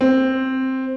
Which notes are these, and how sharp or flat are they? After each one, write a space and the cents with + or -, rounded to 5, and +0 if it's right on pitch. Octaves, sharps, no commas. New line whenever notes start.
C4 +5